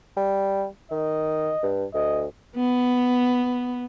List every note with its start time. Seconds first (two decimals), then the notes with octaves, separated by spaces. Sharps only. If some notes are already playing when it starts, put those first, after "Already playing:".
0.17 G3
0.91 D#3 D#5
1.63 G2
1.94 D2 D#5
2.56 B3